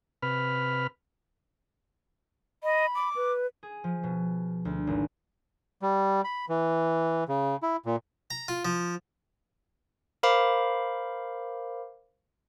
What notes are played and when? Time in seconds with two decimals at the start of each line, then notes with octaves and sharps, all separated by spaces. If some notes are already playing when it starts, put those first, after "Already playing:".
0.22 C3 B4 B5 F6
2.63 D#5 B5
2.95 D6
3.16 B4
3.63 G#4
3.84 F3
4.03 B2
4.65 D2
4.87 G#1
5.82 G3
6.24 B5
6.49 E3
7.28 C#3
7.63 E4
7.85 A#2
8.30 A#5
8.48 F4
8.65 F3
10.23 A#4 C5 F5 B5 D6